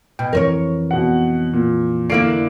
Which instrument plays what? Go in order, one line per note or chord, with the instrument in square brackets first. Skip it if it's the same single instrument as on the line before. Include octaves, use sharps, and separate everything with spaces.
[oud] B2 [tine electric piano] G5
[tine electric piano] F2 E3 [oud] A#4 C5 C#5
[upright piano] B2 F#5
A#2
[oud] D3 A#3 E4 [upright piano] C7 D7